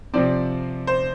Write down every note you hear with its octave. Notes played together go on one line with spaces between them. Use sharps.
C3 F3 C4 D5
C5